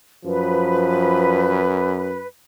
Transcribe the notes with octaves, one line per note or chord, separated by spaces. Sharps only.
F#2 F3 B4